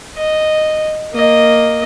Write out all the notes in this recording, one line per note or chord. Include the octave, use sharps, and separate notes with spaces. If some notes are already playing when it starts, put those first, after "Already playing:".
D#5
A#3 D#5